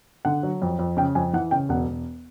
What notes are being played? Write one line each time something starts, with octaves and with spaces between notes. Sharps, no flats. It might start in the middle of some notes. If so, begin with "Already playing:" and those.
D3 F#5
F#3
F2
F2
C#3 G5
F2 G#5
E3 F#5
C#3 G5
E1 F#5
E1